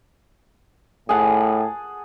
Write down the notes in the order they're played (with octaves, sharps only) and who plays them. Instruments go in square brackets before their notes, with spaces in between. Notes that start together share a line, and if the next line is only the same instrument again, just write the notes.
[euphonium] A2 [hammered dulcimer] G#4 F#5 A5